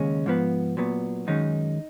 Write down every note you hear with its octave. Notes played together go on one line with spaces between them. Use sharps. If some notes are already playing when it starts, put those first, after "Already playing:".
Already playing: D#2 C#3 G#3 C#4
G#2 F3 B3
A#2 F#3 B3
F#2 D#3 G#3 C#4 D#4